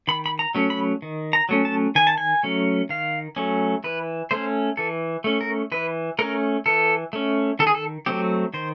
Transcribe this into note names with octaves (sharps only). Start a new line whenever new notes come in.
D#3 B5
B5
A#5
F#3 A3 C#4
B5
D#3
A#5
F#3 A3 C#4
A5
D#3 G#5
A5
G#5
F#3 A3 C#4
D#3 F5
F#3 A3 C#4
E3 B4
A3 C#4 C5
E3 A4
A3 C#4
A#4
E3 B4
A3 C#4 A#4
E3 A4
A3 C#4
D#3 A4
G#4
A4
F#3 A3 C4 G4
D#3 C5